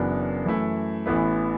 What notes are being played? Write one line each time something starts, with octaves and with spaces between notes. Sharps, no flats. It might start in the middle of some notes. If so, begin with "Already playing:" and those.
Already playing: F#1 F#2 E3 B3 D4
F#2 E3 A3 E4
A1 A2 E3 B3 E4